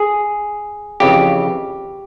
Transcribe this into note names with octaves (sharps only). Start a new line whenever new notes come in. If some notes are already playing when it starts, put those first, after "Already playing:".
Already playing: G#4
F2 C#3 E3 G4